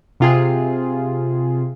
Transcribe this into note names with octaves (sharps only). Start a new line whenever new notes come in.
C3 F4 G#4